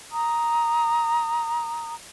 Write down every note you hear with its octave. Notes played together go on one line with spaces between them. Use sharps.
A#5 D#6